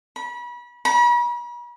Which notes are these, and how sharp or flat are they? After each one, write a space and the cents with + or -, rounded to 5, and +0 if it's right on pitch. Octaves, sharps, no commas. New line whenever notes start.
B5 -30
B5 -45